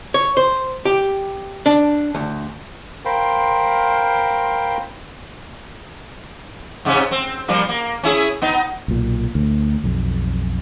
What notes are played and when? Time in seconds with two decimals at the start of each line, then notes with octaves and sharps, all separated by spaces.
0.14 C#5
0.37 C5
0.85 G4
1.66 D4
2.15 D2
3.05 A#4 C5 F5 G5 B5 C6
6.85 G#2 C3 C#4
7.11 C4
7.48 F3 G3 A#3
7.69 A#3
8.03 C#4 E4 G#4
8.42 B3 D#4
8.88 B1 A#2
9.35 D2
9.84 B1 F2